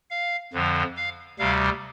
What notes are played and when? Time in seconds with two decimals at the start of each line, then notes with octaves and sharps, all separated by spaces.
0.10 F5
0.53 F2 D3 F3
0.96 F5
1.39 D2 C3 G3 F5